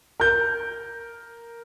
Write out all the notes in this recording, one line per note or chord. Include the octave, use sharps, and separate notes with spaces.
A#4 G6